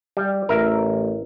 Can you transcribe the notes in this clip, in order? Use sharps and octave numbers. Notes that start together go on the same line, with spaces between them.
G3
A1 A#4 E5